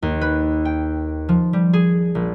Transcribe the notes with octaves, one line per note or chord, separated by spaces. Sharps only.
D#2
B4
G5
F3
G3
G#4
A#1